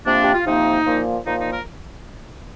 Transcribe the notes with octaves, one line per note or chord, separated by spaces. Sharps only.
C3 F3 A#3 D4
G4
F4
C3 F3 A#3 D#4
A#2 F3 A#3
A#2 F3 A#3 D#4
D#4
A#4